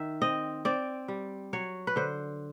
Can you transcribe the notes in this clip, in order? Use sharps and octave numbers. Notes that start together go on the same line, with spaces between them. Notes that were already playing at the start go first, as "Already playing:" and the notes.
Already playing: D#3 E5
C4 D#5
C4 D5
G3
F#3 C#5
B4
D3 C5